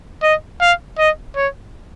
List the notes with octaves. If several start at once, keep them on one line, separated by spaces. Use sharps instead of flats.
D#5
F5
D#5
C#5